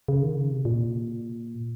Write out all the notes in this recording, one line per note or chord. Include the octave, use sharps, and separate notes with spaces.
C#3
D#3
C#3
C3
A#2